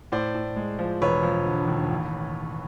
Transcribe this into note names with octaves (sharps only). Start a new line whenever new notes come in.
A2 C5 D5
A2
G#3
F3
E1 B4 C#5
F3
D3
D#2
A1